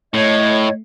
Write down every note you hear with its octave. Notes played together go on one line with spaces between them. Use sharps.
A2 A3 C#5 D#5 G#6